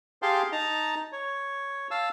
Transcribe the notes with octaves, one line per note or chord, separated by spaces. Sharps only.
G4 G#4 F5 G5 A5 C6
D#4 A5 A#5
C#5
F5 A5 E6